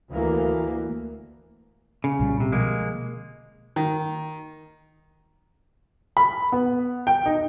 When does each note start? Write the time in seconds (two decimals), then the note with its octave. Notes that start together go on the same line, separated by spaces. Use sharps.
0.11 D2 E3 A#3
2.04 C#3
2.19 C2 A#2 G3
2.40 C3
2.52 B2 D3 F3 G#3 A#3
3.76 D#3
6.17 B5
6.52 B3
7.07 G5
7.26 D#4